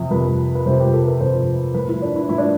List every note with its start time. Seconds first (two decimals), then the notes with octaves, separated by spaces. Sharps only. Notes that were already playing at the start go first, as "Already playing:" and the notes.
Already playing: F2 C3 F3
0.11 F2 C3 F3 B4
0.55 B4
0.66 F2 C3 F3 C5
0.80 G4
0.93 A4
1.07 B4
1.20 F2 C3 F3 C5
1.74 A2 F3 B4
1.89 E4
2.02 D4
2.16 E4
2.29 A2 F3 E4
2.38 D4